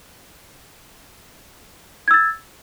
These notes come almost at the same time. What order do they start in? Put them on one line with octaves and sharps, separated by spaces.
G#6 E6 A6